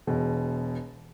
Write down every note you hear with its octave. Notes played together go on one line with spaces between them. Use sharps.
E1 B2